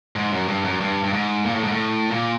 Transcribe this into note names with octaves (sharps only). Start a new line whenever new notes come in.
G#2
F#2
G2
F#2
G2
G2
G#2
A#2
A2
G#2
A2
A#2